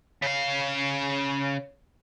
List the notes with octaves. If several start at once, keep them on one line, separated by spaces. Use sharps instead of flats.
C#3 F5